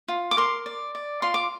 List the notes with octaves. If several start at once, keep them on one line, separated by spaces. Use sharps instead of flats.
F4
D6
A#4 C6
D5
D5
F4 C6
D6